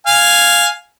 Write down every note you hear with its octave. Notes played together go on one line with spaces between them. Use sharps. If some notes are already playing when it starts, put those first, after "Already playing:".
F5 G#5